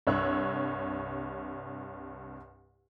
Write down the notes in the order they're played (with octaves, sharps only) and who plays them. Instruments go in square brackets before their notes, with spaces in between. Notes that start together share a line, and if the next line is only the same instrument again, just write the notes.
[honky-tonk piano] C2 G2 C#5 E6 F#6